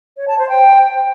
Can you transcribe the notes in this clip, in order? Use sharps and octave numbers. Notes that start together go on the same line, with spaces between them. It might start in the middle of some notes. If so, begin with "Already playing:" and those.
C#5
A5
C5
G5